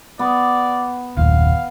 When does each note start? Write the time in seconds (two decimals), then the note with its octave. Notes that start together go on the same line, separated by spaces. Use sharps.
0.19 B3 D5
1.17 F#1 D#2 A#2 F5